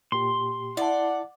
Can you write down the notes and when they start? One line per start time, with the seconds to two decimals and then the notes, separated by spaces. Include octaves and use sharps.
0.12 A#2 G4 C6
0.77 E4 D5 F#5 A5